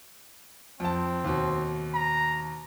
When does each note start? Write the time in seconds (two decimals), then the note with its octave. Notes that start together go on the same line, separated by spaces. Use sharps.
0.80 F2 C4 A5
1.24 D#2 B2
1.95 A#5